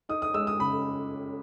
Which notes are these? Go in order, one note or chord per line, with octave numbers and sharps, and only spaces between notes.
D#4 D#6
D#6
G#3 E6
D#6
C#3 B5